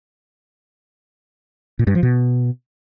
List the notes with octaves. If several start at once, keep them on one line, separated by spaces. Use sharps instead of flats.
A#2
G2
F3
B2